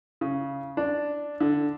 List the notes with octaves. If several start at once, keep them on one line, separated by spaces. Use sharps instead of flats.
C#3
D4
D3